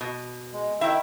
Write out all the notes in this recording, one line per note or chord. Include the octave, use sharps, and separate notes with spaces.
B2
G#3
D#3 E4 E5 G5